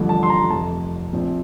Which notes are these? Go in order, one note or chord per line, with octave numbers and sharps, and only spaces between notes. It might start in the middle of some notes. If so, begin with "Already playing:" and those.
Already playing: A1 G2 D3 F3
A5
C6
A#5
F1 F2 C3 A5
A#1 A#2 F3 C4